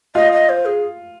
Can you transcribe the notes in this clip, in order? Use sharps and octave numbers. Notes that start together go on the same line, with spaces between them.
F4 D#5
D#5
C5
G#4